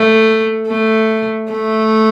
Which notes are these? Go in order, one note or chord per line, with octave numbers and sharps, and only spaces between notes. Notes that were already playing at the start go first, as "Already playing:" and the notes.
Already playing: A3
A3
A3